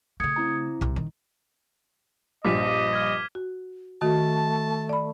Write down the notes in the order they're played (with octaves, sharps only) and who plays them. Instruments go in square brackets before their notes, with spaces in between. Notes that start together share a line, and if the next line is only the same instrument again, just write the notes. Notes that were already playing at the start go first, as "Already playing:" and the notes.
[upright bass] C#3 A3 [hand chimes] D#6 G#6 C#7
[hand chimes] C4 E4 A#5
[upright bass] C2 C3
D#3
[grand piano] A#1 [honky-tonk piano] G2 F3 [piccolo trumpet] D#5 [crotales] D6 B6 D#7
[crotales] F6 G#6
[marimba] F#4
[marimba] D#3 [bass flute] A3 [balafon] F#4 [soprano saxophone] A5
[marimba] D5 B5